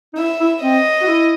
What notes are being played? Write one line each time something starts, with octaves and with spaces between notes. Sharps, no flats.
D#4
E4 E5
E4
C4 D#5
F#4
E4